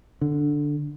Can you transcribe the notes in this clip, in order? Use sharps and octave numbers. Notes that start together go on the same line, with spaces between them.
D3